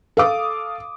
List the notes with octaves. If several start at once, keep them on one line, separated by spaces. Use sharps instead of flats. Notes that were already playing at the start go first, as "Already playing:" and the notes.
A4 F5 D6 D#6